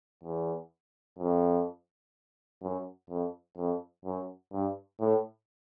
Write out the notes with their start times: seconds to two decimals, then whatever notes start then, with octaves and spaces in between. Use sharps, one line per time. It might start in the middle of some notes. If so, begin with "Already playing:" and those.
0.23 E2
1.19 F2
2.63 F#2
3.09 F2
3.57 F2
4.05 F#2
4.53 G2
5.00 A2